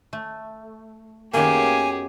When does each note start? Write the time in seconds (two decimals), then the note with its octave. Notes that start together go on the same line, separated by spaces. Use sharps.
0.13 A3
1.33 F#2 D#3 A#3 B3 G4 G#4 G#5